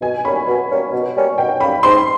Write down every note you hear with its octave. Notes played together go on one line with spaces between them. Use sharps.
B2 G#5
G3 A#3 C#4 B5
B2
G3 A#3 C#4
B2
G3 A#3 C#4
B2 G5
G3 A#3 C#4 B5
G#2 C6